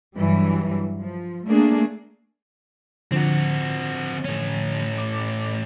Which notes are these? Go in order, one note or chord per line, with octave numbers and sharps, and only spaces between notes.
G2 E3 F#3 G3
F3
A3 A#3 D4 G#4
D3 F3 C4 F#4
A2 C#4
D6